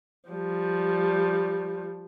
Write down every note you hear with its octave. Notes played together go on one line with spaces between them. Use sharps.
F3 G3